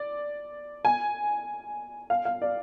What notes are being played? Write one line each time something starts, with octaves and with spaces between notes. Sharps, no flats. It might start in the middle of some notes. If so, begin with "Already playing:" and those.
Already playing: D5
G#5
F5
F5
D5